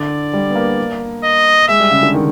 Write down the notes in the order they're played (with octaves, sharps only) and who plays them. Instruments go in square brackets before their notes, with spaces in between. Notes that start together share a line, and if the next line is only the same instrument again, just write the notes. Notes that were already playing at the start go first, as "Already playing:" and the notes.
Already playing: [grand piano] D3 [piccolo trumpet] D5
[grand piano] G3
B3
A#3
[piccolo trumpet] D#5
[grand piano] G#3 [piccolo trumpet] E5
[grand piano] G3
C#3
D3
D#3